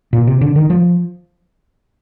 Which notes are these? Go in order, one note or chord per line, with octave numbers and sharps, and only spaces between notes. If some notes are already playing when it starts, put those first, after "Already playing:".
A#2
C3
D3
D#3
F3